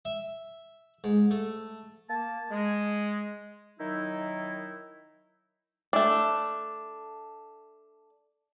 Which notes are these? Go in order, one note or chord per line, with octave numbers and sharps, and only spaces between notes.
E5
G#2
A3
A#3 A5
G#3
D#3 F#3 D#4 E4
A3 D4